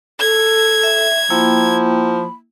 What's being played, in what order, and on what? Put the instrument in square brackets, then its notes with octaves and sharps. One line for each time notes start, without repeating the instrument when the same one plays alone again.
[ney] A4 [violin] G#6
[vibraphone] E5
[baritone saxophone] F3 [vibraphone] A#3 E4 G5 [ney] B5